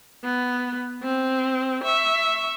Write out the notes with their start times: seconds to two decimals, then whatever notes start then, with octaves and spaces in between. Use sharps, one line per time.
0.24 B3
1.03 C4
1.84 E5 C#6